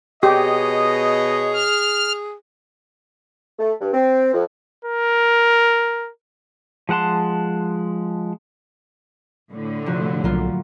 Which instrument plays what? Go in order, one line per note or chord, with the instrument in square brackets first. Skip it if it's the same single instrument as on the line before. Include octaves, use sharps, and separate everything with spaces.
[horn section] B2 C#5 D#5 [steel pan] G4 [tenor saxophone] G#4
[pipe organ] F6
[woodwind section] A3
G2
C4
F2
[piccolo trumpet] A#4
[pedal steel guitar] F3 G#3 F#5 A5 C6
[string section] A2 D3
[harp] C3 F3 F#4
[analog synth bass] B1 [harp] F#3 A#3 F4